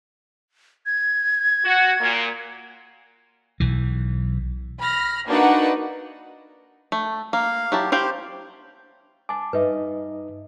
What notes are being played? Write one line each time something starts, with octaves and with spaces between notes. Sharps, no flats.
G#6
F#4
A#2
B1 E3
B5 F6 A#6
A#3 D4 D#4 F#4 B4 F#5
A3
A#3 F5
F#3 E4 G4 A5
E4 G4 C5 F5 G5
G#5 A5 D6
G2 D#4 B4 D#5 E5